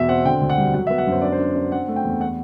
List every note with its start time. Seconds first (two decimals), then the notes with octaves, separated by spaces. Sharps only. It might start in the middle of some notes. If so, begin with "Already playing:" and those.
Already playing: E2 B2 E5
0.08 C4 F#5
0.25 D3 G5
0.41 D2
0.50 F#5
0.58 G3
0.74 F#3 F#5
0.87 E5
0.90 B3
0.98 F#5
1.07 F#2 C5
1.22 D4 D5
1.32 C5
1.39 D4
1.56 D4
1.72 C4 F#5
1.88 A3
1.96 G5
2.05 E2
2.21 F#5